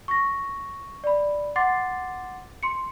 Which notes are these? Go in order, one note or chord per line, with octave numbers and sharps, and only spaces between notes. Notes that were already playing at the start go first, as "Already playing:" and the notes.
C#6 A#6
D5 B5
F#5 C6 D6 A6 C7
C6 C#7